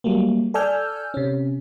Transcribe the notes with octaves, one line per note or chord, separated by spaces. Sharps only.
F#3 G3 A3 A#3
A4 D5 G#5 E6 F6 G6
C3 C#4